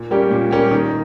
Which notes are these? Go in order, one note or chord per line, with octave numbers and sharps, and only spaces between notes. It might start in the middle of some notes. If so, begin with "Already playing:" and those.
Already playing: A#2
G3 A#3 C#4 G4
A#2
G3 A#3 C#4 G4
D#3